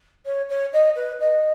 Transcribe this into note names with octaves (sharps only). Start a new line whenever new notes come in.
C#5
C#5
D#5
B4
D#5